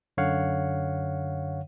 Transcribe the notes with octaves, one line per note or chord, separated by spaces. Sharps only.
F#2 D3 C#5 F5 F#5